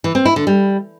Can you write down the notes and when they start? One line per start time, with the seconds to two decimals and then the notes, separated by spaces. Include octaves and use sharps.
0.04 E3
0.15 C4
0.25 E4
0.36 D3
0.47 G3